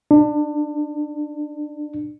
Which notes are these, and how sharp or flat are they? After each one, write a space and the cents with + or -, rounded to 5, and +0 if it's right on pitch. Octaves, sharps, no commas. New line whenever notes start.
D4 +25